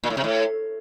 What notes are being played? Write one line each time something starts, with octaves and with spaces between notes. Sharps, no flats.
A#2
A2
C3
A2